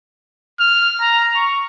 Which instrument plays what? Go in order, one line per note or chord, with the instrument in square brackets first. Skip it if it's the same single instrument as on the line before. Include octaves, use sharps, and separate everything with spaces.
[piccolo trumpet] F6
A#5
C#6